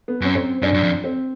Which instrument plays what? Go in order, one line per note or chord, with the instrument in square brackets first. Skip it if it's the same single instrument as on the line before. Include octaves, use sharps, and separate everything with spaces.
[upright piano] B3
[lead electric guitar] F#2 [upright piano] C#4
[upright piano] C4
[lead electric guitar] F#2 [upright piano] D4
[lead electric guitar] F#2
F2
[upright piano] C4